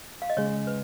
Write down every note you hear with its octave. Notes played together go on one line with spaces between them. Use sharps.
F5
D#5
C#3 G#3 C#4 C#5
B4